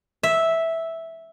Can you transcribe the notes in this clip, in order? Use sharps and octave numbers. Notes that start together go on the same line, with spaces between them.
E5